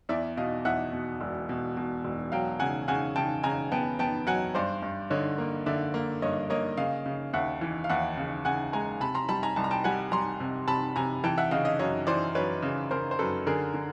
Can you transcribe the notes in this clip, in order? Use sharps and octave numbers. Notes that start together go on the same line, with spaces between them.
E2 D5 E5
B2 D#5 F5
E2 E5 F#5
B2
E1
B2
B2
E1
F#3 F5 G5
C#3 F#5 G#5
C#3 F#5 G#5
C#3 G5 A5
C#3 G#5 A#5
B3 G5 A5
B3 G5 A5
F#3 F#5 G#5
G2 C5 D5
G2
D3 C#5 D#5
A#3
D3 D5 E5
A#3
G2 C#5 D#5
A#3 C#5 D#5
C#3 D#5 F5
C#3
D#2 E5 F#5
E3
F5
D#2 E5 F#5
C#3
C#3 F#5 G#5
G#3 G#5 A#5
C3 A5 B5
A#5 C6
G3 A5 B5
G#5 A#5
C2 A5
A#5
G5 A5
G3 F#5 G#5
G3 A#5 C6
C3
C3 A5 B5
C3 G#5 A#5
E3 G5 A5
E5 F#5
C#3 D#5 F5
D#5 F5
F#2 C#5 D#5
E3 C5 D5
F#2 B4 C#5
C#3
C#3 A#4 C5
C5
F#2 A4 B4
D3 G#4 A#4
D3